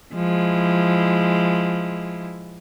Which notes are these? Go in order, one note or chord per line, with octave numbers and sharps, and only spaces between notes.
F3 G#3 E4